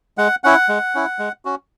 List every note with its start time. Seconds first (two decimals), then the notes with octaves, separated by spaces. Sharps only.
0.18 G#3 F#5
0.44 C#4 E4 F#5
0.69 G#3
0.95 C#4 E4
1.19 G#3
1.45 C#4 F#4